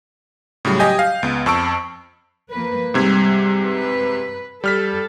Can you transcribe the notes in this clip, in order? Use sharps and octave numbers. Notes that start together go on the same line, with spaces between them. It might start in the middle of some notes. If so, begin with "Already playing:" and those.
A2 C#3 F#3 G3
G4 D#5 G#5 G6
F5
C#2 B3
F2 A5 C#6 E6 D7
F3 A#3 B4
G#2 C3 G3 G#6
B4
G3 A4 F6 B6